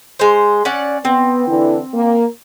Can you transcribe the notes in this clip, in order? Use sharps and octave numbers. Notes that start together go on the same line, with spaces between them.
G#3 C5
C#4 D5 F#5
B3 C4
D3 E3
A#3